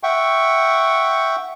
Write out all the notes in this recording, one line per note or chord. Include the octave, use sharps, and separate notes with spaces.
E5 F#5 G5 C#6